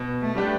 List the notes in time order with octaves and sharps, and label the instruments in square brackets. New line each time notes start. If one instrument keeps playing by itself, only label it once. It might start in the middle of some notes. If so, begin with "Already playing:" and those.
Already playing: [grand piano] B2
[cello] A3
[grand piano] G3 D4 G4 B4